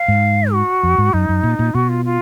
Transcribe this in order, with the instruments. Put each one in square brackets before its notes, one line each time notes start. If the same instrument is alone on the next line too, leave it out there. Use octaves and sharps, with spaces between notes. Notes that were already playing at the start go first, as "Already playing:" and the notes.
Already playing: [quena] F5
[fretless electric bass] G#2
[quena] F#4
[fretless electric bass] F2
G#2
[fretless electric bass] F#2 [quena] D#4
[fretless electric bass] F#2
A#2
A#2
[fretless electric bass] B2 [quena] F#4
[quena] F4
F4